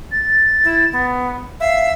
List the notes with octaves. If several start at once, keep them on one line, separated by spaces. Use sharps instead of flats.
A6
E4
B3
E5 F5